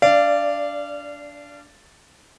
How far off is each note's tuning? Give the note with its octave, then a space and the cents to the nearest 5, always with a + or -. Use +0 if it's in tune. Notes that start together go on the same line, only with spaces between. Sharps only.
D4 -20 D5 +0 F5 -30